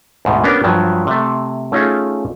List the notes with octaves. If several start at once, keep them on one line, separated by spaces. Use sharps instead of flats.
D2 G#2 B2
A#3 B3 C#4 D4 G4 A#4
G2 F3 F#3
C3 A3
A3 C#4 D#4 F4 G#4 A4